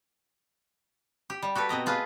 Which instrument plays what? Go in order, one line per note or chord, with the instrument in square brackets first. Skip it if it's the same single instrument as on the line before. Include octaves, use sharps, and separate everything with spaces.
[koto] G4
G3
F#4 G4 A4 B4
B2 C4 D#5 A#5
A3 F4 G#4 B4